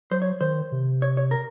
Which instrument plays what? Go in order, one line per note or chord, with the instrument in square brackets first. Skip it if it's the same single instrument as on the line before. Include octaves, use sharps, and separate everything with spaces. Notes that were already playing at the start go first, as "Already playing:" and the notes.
[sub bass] F#3 [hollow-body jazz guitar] C5
[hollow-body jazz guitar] C#5
[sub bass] D#3 [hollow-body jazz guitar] C5
[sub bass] C3
[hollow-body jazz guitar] C#5
C#5
A#4